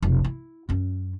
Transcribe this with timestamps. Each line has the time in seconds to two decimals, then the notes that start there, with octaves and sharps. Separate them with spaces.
0.03 F1 B1
0.24 E4
0.69 F#2 C#4